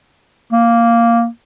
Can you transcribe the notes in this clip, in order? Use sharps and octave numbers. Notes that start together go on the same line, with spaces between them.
A#3